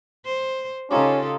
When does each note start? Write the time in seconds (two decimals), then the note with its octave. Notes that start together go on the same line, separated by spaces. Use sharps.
0.25 C5
0.90 C#3 C#4 D#4 F4 G4 A4